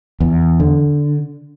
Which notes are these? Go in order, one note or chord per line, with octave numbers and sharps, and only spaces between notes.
E2
D3